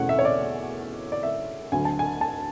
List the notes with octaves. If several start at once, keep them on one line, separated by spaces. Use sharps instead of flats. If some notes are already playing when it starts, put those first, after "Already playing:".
Already playing: E2 B2 A3 C#4 F#5
E5
C#5
D5
D5
E5
D2 D3 F#3 G#5
A5
G#5
A5